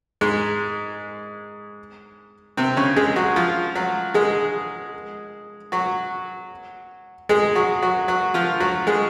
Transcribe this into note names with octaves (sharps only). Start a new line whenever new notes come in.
G#2 G#3
C3 C4
C#3 C#4
G#3 G#4
F#3 F#4
F3 F4
F#3 F#4
G#3 G#4
F#3 F#4
G#3 G#4
F#3 F#4
F#3 F#4
F#3 F#4
F3 F4
F#3 F#4
G#3 G#4